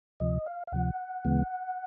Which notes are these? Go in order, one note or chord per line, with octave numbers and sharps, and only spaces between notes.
D2 C3 F3 D#5
F5
F5
D2 C3 F3 F#5
D2 C#3 E3 G#3 B3